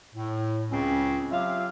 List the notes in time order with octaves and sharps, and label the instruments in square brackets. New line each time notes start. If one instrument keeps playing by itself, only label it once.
[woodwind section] A2
C#2 C#3 C4 C#4
F#3 F4 G4 E5 F5